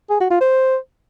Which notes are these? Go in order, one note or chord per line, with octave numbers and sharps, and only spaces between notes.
G#4
F#4
F4
C5